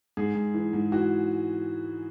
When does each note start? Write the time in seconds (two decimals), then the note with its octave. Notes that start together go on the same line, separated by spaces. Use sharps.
0.17 G#2 G#4
0.35 G#2
0.54 E3
0.73 G#2
0.92 E3 F#4